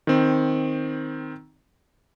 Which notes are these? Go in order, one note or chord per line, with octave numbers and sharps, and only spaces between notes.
D#3 C4